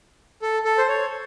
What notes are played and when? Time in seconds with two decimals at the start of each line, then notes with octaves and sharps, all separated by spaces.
0.42 A4
0.65 A4
0.78 C5
0.88 C#5